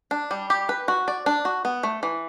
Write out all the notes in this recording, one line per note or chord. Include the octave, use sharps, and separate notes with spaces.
D4
G3
G4
B4
F#4
D5
D4
F#4
B3
A3
E3